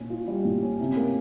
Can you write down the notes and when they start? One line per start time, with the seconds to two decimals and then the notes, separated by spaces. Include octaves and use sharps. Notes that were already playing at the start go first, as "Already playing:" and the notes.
Already playing: A#2 C#4
0.10 F4
0.28 G3
0.45 A#2
0.63 C#4
0.80 C3
0.97 A#3